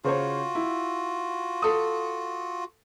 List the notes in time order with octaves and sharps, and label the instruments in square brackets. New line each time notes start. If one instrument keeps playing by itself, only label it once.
[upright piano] C#3 C5 C#5 [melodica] F4 F#4
[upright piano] E4
A4 D#6